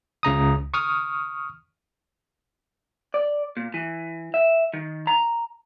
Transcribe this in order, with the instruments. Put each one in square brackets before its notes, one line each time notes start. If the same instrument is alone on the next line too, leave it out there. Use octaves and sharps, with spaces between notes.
[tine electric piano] C#2 C#3 A#5 D#6
C#6 D#6 F6
[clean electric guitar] D5
A#2
E3
E5
D#3
A#5